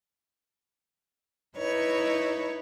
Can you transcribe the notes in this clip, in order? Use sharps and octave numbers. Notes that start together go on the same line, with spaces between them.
D#4 E4 B4 C#5